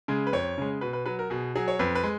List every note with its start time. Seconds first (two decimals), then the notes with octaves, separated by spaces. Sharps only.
0.08 C#3 G#3
0.27 B4
0.33 F2 C#5
0.58 C#3 G#3
0.81 B2 B4
0.93 B4
1.06 F#3 B4
1.19 A#4
1.30 B2 G#4
1.56 F#3 G#4
1.68 C#5
1.79 F2 B4
1.95 B4
2.03 G#3